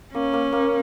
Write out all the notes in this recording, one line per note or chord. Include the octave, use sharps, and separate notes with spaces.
A#3 C#4
A#3
A#3